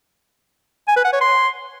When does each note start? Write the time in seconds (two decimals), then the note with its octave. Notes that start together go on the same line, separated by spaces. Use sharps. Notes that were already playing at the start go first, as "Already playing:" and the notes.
0.88 G#5
0.96 B4
1.05 F#5
1.13 C#5
1.21 C6